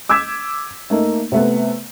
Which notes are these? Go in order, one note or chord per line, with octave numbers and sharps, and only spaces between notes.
D6 E6 G6 G#6 B6 E7
A3 A#3 D#4
C3 A3 B3